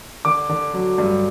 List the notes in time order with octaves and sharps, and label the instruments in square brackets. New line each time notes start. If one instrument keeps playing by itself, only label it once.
[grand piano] D3 D6
D3
F#3
G2